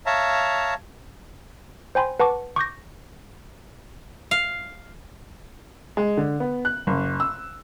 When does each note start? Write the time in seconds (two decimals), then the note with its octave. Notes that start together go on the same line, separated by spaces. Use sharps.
0.06 C#5 E5 F5 A5 A#5
1.95 C5 G5 G#5 B5 C6
2.20 B4 F#5 A5 C#6 D6
2.56 C#6 D6 G6 A#6
4.31 F5
5.97 G#3
6.17 D3
6.40 B3
6.65 F#6
6.87 F#1
7.20 E6